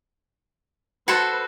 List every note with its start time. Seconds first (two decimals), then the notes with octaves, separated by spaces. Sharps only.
1.08 F#4 A4 B4 C5